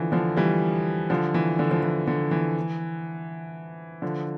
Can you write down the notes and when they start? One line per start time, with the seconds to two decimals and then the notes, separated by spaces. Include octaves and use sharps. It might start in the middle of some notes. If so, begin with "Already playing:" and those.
Already playing: D3 E3 F3
0.12 D3 F3
0.37 E3 G3
1.10 D3 F3
1.34 E3
1.59 D3
1.71 F3
1.83 E3
2.07 D3
2.31 E3
4.02 D3 F3